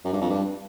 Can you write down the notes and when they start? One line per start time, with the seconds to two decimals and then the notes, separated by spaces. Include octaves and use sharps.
0.04 F#2
0.13 G2
0.21 F2
0.30 G2